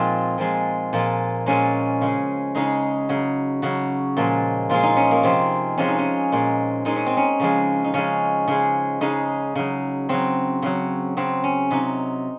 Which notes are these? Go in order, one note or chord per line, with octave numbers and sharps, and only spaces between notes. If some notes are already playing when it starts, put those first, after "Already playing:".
Already playing: A#2 F3 G#3 C4 D#4
A#2 F3 G#3
A#2 F3 G#3
A#2 F3 G#3 C#4
C#3 G#3
C#3 G#3 D#4
C#3 F#3
C#3 F#3 F#4
A#2 F3 G#3
A#2 F3 G#3 F4
D#4
C#4
A#3
C3 F3 G#3 C4
C3 F3 G#3 C#4
D#4
C#4
A#2 G#3
A#2 G#3 D#4
C#4
C4
C#4
C#3 F3 G#3
D#4
C#3 F3 G#3 C#4
C#3 G#3
C#3 G#3 D#4
C#3 F#3
C#3 F#3 C4
C#3 F#3
C#3 F#3 C4
C#4
C3 F#3 D#4